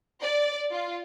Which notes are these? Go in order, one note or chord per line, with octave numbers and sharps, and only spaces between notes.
D5
F4